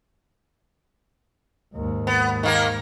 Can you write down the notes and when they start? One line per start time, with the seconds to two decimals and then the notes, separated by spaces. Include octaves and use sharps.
1.74 D#2 G#2
2.07 B3
2.43 D#3 A#3 A#4